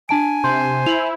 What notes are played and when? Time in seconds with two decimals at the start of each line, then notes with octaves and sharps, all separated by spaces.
0.09 D4 G#5 A5 D7
0.44 C3 C5
0.86 E4 F7 F#7